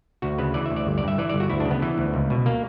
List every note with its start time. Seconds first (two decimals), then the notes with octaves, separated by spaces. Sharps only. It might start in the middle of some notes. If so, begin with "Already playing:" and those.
0.22 D2 F#4
0.38 C#3 B4
0.54 E3 D5
0.66 D2 E5
0.76 D5
0.87 G1
0.98 D5
1.03 G2 E5
1.18 E3 D5
1.29 G1 D5
1.40 F#4
1.50 D2 E4
1.60 D4
1.65 C#3
1.71 B3
1.82 E3
1.98 D2
2.14 C#2
2.30 B2
2.46 A#3